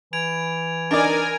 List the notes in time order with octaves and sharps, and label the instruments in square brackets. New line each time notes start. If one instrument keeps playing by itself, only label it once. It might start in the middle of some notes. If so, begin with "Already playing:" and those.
[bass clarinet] E3 [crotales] G#6 D7 F7
[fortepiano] D4 D#4 D5 [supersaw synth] A#4 G#5 [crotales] G#6 D7